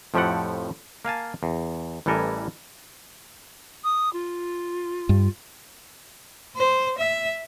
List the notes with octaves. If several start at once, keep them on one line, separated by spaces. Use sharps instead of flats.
F2 A2 F3 G4 A4 F#5
A#3 F5 G#5 A5
E2
A1 E3 G3 A4 A#4 G#5
D#6
F4
G2
C5
E5